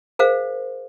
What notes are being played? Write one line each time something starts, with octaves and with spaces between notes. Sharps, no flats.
G#4 A#4 C5 F5